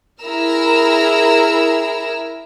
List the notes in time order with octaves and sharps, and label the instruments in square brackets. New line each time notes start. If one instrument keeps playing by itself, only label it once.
[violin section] E4 G#4 A#4 A#5 E6 F6